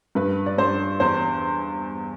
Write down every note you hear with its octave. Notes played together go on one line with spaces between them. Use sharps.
G2 B4
D5
G2 C5
E2 C5